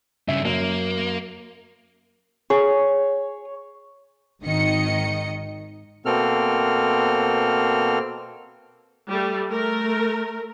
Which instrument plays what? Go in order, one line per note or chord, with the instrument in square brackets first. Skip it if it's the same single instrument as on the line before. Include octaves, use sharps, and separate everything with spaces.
[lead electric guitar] G2 C#3 [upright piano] E5
[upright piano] F#2 [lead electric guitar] A#3
[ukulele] G#4 [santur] C#5
[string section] G#1 D#3 D#5 C#7
[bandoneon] B2 A#3 C4 A4 F6
[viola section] G3 A3
A3 A#4